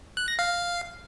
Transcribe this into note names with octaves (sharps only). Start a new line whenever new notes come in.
F#6
A#6
F5